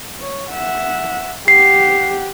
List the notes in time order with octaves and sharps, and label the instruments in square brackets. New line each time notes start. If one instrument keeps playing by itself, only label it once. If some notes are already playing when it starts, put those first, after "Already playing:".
[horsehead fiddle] C#5
E5 F#5
[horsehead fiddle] G4 F#5 [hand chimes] C7